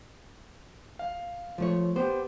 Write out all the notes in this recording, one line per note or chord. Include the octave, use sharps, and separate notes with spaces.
F5
F3 A3 C#5
B3 G4 C5